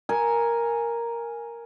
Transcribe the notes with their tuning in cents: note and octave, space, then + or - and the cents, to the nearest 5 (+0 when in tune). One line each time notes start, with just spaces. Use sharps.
A#4 +0 G#5 +0